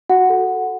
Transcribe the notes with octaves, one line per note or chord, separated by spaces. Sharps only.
F#4 F#5
A4